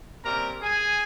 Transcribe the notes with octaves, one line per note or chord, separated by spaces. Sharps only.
C3 G3 A#3 C#4 A#4 A#5
G#4 G#5